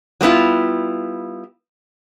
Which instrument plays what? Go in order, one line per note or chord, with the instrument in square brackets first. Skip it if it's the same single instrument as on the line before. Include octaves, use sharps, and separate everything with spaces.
[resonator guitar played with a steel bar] F#3 G3 B3 E4 F4